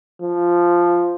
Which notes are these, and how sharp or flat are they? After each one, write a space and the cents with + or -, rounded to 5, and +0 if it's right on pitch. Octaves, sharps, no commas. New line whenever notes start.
F3 -5